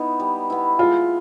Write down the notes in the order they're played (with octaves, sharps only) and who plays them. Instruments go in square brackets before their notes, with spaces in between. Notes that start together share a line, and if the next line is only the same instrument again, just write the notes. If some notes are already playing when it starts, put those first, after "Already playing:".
Already playing: [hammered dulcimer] B3 E4 [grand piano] D#4
[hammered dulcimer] G3
B3 E4
[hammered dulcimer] G#3 [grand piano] F4